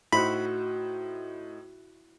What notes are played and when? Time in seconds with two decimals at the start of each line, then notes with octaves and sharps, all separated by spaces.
0.12 A2 D#4 E4 F#4 C5 B5